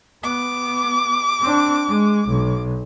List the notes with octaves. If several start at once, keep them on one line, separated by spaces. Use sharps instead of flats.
B3 D6
C4 D4
G#3
B1